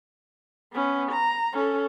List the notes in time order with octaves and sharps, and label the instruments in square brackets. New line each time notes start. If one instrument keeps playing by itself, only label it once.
[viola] B3 C#4
A#5
C#4 A4